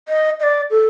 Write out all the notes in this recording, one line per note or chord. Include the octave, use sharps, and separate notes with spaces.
D#5
D#5
D5
A4